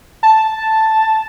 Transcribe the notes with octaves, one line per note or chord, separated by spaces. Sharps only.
A5